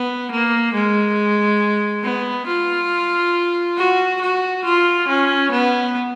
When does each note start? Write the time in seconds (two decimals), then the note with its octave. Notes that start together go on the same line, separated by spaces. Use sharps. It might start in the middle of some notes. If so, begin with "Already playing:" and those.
Already playing: B3
0.31 A#3
0.74 G#3
2.04 B3
2.47 F4
3.78 F#4
4.21 F#4
4.65 F4
5.08 C#4
5.51 B3